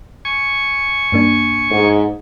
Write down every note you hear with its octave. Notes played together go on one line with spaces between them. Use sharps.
G#5 C#6
G2 A#3 D4
G#2